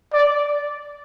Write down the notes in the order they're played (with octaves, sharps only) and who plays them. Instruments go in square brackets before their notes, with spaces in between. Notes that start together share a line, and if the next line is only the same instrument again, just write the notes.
[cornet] D5